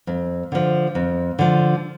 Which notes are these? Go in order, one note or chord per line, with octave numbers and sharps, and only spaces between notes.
F2
D3 F3
F2
D3 F3